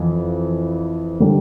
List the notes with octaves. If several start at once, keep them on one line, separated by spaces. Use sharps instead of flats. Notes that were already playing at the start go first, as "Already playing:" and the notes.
Already playing: F2 E3
D3 G3